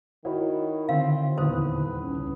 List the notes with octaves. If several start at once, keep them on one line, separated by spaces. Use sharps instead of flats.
D#3 E4 F#4 C#5
D3 D#3 C4 F5
D#1 E2 B4 C5 D#6
C#2 C#4